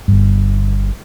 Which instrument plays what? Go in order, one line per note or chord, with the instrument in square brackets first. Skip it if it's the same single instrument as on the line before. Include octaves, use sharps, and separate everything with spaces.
[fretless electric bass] G1 G2